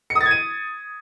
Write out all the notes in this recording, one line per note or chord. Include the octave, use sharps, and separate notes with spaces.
C#7
D#6
A6
G#6
D#7